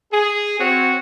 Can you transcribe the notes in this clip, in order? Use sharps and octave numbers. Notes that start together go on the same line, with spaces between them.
G#4
C4 F#4 C#5